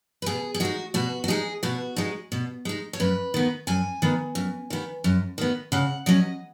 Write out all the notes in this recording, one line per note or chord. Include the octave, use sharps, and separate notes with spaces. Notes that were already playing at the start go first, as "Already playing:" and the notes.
B4
B2 G#4
G#4
G#3 D#4 F#4
B2 F#4
F#4
G#3 D#4 G#4
B2 F#4
G#3 D#4
B2
G#3 D#4
C#5
F#2 B4
D#3 B3
F#2 G#5
D#3 B3
F#2
D#3 B3
F#2
D#3 B3
C#3 F#5
F#3 C#4 D#5